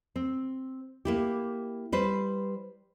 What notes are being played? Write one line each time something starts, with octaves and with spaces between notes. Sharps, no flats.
C4
A#3 E4 G4
G3 B4 C5